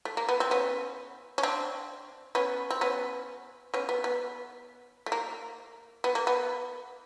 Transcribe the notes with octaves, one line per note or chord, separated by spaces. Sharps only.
A3
A#3
B3
C4
B3 C#4
C#4
C4 D4
B3 C#4
C4
B3 C#4
B3 C#4
B3
B3
A3
A#3
B3
A#3
B3